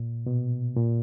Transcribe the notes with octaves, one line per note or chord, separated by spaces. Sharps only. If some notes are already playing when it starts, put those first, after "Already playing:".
Already playing: A#2
B2
A#2